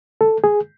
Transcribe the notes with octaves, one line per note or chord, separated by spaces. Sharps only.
A4
G#4